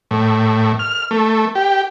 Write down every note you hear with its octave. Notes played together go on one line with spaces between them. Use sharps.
A2
F6
A3
G4